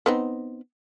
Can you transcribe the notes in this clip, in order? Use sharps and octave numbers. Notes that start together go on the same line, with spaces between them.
B3 C4 D#4